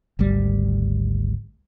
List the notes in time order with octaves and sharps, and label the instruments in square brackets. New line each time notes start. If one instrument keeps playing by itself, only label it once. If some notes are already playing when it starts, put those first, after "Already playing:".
[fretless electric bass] G#1 D2 G3